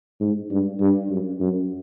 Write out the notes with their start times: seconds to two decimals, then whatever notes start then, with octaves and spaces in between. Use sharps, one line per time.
0.21 G#2
0.50 G2
0.80 G2
1.10 F#2
1.40 F#2